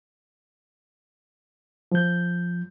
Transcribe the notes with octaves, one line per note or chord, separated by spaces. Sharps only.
F3 G6